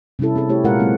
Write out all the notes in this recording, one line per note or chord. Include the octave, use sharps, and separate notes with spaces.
C3 G3 C#4 E4 A4
C4 G#4 A4
A3 E4 G4 C#5
A#2 G#3 F4 A#4 F#5
F#3 G#3 C4